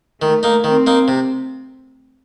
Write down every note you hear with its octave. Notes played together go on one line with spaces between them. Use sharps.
D#3 A3
A#3 D#4
D#3 C4
A#3 D#4
C3